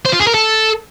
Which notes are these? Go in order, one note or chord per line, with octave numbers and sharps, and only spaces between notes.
C5
F4
G#4
A#4
A4